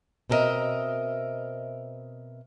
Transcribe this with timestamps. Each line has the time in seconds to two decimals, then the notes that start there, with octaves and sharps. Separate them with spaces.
0.30 B2 C4 A4 A#4 D#5 E5